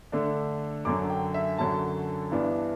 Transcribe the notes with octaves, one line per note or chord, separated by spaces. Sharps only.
D3 A3 D4
F#2 D3 F#3 D6
G5
E5
F#2 D3 F#3 A5
G2 E3 B3 D4